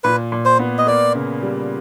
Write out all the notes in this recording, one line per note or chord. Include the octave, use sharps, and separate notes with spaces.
A#2 B4
A#2
C5
B3
D#5
A#3 D5
C#3
G3